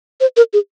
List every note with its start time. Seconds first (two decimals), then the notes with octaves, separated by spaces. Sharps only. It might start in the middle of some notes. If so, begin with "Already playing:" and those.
0.21 C5
0.37 A#4
0.53 G#4